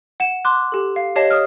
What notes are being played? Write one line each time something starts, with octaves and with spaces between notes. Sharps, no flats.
F#5 E7
C6 D6 F#6
G4 A4
F5
G4 C#5 D#5 A5 C7
D#6 F6